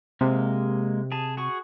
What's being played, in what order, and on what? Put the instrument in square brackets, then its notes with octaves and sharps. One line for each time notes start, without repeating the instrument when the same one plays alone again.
[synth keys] C3 [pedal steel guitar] G#3 A#3
[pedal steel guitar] G#4 A5
F#4 G#4 C#6